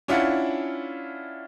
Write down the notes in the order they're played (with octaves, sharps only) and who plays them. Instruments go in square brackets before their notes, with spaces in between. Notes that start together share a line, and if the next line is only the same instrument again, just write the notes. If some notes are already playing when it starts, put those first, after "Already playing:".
[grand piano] C#4 D4 E4 F4 F#5